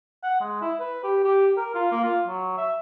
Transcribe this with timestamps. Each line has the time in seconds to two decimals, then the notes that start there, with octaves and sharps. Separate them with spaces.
0.24 F#5
0.41 G#3
0.62 E4
0.80 B4
1.04 G4
1.24 G4
1.57 A#4
1.75 F4
1.92 A#3
2.04 F4
2.27 F#3
2.57 E5